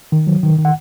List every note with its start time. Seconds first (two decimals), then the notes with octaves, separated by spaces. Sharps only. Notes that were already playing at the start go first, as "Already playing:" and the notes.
0.12 D#3
0.27 F#3
0.43 D#3
0.58 D#3
0.65 F#5